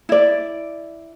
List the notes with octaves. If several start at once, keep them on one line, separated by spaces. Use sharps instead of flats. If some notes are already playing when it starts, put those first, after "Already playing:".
E4 D5